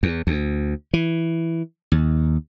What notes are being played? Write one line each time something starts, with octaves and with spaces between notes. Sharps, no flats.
E2
D2
E3
D#2